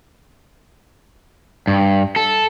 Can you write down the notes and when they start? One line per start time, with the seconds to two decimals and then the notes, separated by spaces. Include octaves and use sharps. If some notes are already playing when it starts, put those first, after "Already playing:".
1.67 G2
2.16 A4